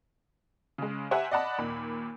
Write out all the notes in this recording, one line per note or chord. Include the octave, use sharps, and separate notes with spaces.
C#3 G#3
G4 C5 E5 F#5 G#5 A#5
D5 D#5 F#5 A5 B5
D#2 A#2 B5